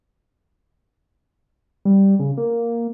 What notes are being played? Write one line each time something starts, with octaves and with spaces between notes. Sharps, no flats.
G3
C#3
A#3